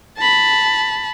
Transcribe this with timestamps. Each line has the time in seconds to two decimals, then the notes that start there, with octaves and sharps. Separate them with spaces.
0.18 A5 B5